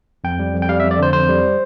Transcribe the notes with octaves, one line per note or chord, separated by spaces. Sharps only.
F2 G5
G3
F2
G5
G3 F5
E5
F2
D5
D3 C5
F2 C5
G3